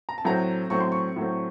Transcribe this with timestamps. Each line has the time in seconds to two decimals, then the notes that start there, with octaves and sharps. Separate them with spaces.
0.09 A#5
0.18 A5
0.25 A2 F#3 A3 C4 A#5
0.70 A2 F#3 A3 C4 C#6
0.80 C6
0.92 C#6
1.16 A2 F#3 A3 C4